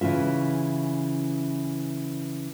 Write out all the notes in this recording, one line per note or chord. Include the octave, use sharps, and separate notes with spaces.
C#3 E3 C#4 F4 E5